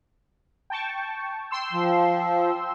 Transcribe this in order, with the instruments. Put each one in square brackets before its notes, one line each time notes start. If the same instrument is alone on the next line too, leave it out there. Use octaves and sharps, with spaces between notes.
[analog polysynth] G5 A5 C#6
G5 C6 E6
[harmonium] F3